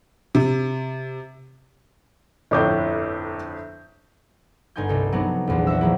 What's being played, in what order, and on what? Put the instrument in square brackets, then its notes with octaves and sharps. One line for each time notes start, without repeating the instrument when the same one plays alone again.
[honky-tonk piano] C3
[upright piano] G1 F2 A2 [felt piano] C#5 D6 G6
[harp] G1 D#4 G#5 C6 G6
C2 D#4 A4
F#3 B3 C4 D4 D#4
A#1 E2 C6
F#4 C5 E5 E6
D#3 F3 F#3 A#3 E4